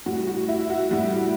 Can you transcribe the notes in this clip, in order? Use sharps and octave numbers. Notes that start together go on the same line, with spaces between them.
A2 G3 F#4
F#4
E4
F#4
A2 G3